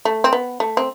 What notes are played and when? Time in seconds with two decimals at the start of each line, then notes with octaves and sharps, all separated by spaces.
0.05 A3
0.24 C4
0.33 B3
0.60 A3
0.77 C4